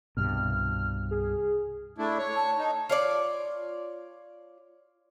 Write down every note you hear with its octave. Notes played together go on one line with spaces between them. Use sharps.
C2 G2 B2 F6
G#4
A3 D4 E4
C#5
A5
D#4
F4 C#5 D5